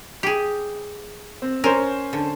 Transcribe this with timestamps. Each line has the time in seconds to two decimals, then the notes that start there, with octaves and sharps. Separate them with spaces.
0.23 G4 G#4
1.42 C4
1.64 C#4 A#4 C5
2.13 D3